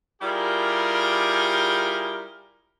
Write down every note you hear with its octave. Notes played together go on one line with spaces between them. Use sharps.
G3 E4 F4 G4 G#4 A#4